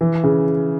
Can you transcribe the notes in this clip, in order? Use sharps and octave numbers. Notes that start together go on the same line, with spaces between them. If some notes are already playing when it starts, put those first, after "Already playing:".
E3
C#3